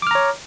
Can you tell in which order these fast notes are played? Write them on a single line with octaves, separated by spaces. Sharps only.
D6 F6 A#5 C#5